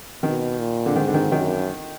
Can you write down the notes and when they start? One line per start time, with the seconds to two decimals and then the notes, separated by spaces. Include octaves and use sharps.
0.23 B2 D#3
0.59 A#2
0.86 D3
0.96 G#2 D#3
1.07 D3
1.14 D#3
1.32 F#2 D#3